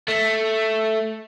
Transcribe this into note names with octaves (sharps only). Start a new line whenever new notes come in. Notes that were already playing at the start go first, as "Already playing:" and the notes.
A3